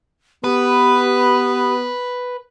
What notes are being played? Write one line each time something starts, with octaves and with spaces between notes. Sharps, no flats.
B3 G4 B4